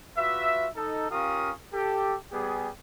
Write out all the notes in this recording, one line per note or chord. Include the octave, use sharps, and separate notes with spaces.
F4 F#4 B4 E5
D#4 A4
C#4 F4 G4 A#4 F5 D#6
G4 A4
G3 B3 G4 G#4